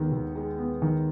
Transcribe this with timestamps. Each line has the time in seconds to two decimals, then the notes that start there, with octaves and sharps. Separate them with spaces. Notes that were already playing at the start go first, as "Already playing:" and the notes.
Already playing: D#2 D#3 G#3 B3
0.12 D#2
0.35 G#3
0.58 B3
0.82 D#3